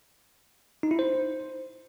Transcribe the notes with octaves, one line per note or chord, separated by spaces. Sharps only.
D#4
E4
C5